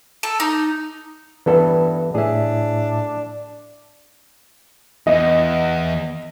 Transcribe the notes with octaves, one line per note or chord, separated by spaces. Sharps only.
A4
D#4
G2 E3 B3 A4
A2 D4 G#4 E5
E2 D#5